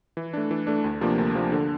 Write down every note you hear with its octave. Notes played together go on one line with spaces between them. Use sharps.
E3
A3 D4
E3
A3 D4
D2
C3 F3 A#3 D4
D2
C3 F3 A#3 D4
D3